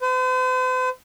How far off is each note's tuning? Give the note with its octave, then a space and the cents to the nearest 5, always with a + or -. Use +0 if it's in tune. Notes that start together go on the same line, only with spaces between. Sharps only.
C5 -45